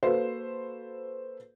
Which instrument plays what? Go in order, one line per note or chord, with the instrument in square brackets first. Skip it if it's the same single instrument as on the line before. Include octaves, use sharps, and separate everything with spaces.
[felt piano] A#3 F#4 A4 B4 C5 F5